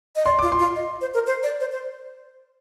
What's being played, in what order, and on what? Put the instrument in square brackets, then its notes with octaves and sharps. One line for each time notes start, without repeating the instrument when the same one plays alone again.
[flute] D#5
[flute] D5 [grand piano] C6
[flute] F4 [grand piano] D6
[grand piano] C6
[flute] F4
D#5
C5
A#4
C5
D5
C5
C5